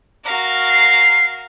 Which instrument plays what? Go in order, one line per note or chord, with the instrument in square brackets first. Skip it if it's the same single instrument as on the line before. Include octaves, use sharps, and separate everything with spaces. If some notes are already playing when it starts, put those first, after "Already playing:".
[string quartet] F#4 A#4 F5
[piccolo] C7